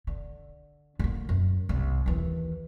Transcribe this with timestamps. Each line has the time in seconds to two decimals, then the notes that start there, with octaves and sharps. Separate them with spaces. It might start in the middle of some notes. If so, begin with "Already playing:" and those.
0.07 D3
0.99 D3 A#3
1.29 F#2
1.69 C2
2.06 D#2 E3